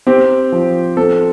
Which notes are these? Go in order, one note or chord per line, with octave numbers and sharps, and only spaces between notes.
C4 G4
F3
C4 A4